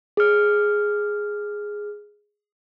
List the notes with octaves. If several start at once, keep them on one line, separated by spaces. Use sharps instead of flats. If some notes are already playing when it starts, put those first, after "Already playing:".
G#4 F6